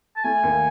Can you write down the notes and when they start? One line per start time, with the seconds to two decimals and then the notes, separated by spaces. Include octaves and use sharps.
0.16 A5
0.24 A3 G#5
0.43 D#2